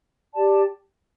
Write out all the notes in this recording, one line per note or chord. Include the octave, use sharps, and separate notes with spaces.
G4 D5 A5